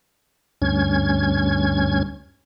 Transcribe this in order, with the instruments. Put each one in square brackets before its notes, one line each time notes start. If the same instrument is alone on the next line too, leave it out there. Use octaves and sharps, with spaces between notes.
[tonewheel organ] D2 G2 C#4 G#6